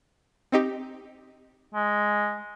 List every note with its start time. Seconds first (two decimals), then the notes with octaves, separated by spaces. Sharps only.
0.52 C4 D#4 G4
1.74 G#3